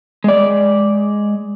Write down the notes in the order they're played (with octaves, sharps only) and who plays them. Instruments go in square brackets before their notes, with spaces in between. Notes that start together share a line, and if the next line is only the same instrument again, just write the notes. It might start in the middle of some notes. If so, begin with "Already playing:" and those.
[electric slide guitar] G#3 D5